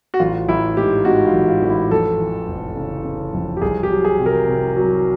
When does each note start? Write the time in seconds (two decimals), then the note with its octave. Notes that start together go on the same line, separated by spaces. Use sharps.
0.14 F#4
0.20 A1 F4
0.49 A1 E4
0.77 G#2 G4
1.05 G#2 F#4
1.27 F4
1.33 A1
1.48 F4
1.62 A1
1.70 E4
1.91 F2 A4
2.20 E3
2.48 F1
2.76 C#3
3.05 C#3
3.33 F2
3.57 G4
3.62 C2 G#4
3.83 G4
3.91 F#3
4.05 G#4
4.19 C3
4.26 A#4
4.48 C3
4.76 F#3